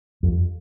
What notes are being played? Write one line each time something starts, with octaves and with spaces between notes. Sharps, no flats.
F2